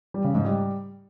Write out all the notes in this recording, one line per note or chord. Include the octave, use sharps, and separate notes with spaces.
G3
C#3
G#2
G3